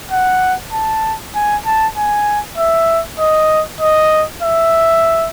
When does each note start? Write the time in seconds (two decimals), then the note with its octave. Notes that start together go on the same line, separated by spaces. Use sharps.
0.11 F#5
0.73 A5
1.35 G#5
1.66 A5
1.96 G#5
2.58 E5
3.19 D#5
3.81 D#5
4.42 E5